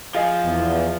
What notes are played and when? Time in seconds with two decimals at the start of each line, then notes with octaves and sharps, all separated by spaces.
0.15 F3 G#4 D#5 F5 G#5
0.44 E2